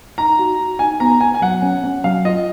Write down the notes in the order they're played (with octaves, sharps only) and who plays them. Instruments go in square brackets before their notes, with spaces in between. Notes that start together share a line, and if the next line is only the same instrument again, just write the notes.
[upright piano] D#4 [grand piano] A#5
[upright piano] F#4
F#4
[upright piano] D#4 [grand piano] G#5
[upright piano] B3 [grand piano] A#5
[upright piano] B3 [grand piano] G#5
[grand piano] G#5
[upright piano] F#3 [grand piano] F#5
[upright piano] C#4
C#4
[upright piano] F#3 [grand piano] F5
[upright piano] F4 [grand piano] D#5